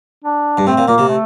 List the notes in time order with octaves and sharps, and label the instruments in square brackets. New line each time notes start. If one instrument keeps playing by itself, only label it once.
[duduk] D4
[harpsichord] G2
[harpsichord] A2 [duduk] C4
[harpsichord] A#2
[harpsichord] A#2 [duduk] A#3
[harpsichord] C3
[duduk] A3